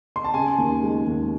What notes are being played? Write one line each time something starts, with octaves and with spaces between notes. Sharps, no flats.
C6
A5
C#3 G#5
D#2
G#3
D#2